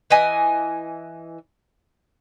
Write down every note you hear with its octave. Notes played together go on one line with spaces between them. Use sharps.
E3 B4 D#5 G#5